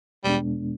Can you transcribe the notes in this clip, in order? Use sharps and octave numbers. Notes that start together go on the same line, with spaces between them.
E2 B2 G3 G#3 B3 D4